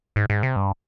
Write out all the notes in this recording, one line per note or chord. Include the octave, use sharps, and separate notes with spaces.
G#2
G#2
C3
G2